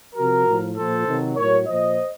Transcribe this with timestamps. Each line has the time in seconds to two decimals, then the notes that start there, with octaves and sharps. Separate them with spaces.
0.15 C3 F3 F#4 A#4
0.45 A2 F3
0.76 A#2 F3 A4 C5
1.06 C3 D#3 F#3
1.36 A2 F#3 A#4 C#5
1.66 A#2 F3 C5 D#5